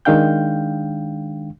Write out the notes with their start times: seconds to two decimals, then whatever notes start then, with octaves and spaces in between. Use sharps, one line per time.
0.05 D#3 G#3 D4 F5 G5 G6